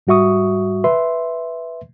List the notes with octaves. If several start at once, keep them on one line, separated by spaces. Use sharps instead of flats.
G#2 G3 F#4 E5 C#6 D#6
B4 E5 C6